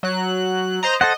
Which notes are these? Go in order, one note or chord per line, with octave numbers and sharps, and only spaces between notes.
F#3 F#6
C5 D#5 A#5
A4 C5 D#5 F#5